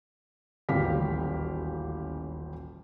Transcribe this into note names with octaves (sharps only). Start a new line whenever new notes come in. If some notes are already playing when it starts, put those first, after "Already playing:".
D#1 A1 D2 G4 F5 B6